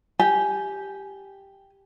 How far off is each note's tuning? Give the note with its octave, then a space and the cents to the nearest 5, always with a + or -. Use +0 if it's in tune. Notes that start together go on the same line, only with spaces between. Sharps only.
G4 +0 G#5 +15